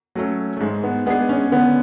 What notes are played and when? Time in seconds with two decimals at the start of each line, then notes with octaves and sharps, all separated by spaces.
0.15 F#3 A3 C#4
0.57 A3
0.60 G#2 G#3
0.84 B3
1.06 G#3 B3 D4 G#4
1.29 C#4
1.52 D3 B3